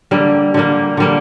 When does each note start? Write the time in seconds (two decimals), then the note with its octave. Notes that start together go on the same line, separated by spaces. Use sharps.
0.11 D3 G3 A#3
0.54 D3 G3 A#3
0.97 D3 G3 A#3